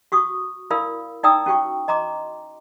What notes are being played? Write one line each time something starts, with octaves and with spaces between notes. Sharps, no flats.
F#4 C#6 D#6
E4 A#4 D5 F5 B5 E6
D#4 D5 G5 A#5 D#6 E6
C#4 F#4 G5 C#6
D#5 A#5 C6 D6